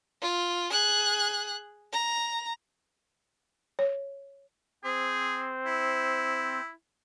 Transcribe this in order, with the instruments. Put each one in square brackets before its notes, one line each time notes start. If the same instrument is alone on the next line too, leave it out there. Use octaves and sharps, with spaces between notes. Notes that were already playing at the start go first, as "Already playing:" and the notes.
[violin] F4
G#4 F#6
A#5
[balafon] C#5
[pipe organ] C4 C5 [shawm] G#4
[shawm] E4